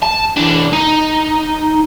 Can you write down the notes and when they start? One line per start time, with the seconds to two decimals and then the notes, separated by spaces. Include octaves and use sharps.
0.02 A5
0.37 E3 D4
0.73 D#4